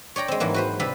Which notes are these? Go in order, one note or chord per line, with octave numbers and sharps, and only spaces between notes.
C#5 D5 G5 A#5
G#3 C4
G#2 E3 F#3 A#3
F#4 B4 C5
C3 G3 C4 F4 B4 B5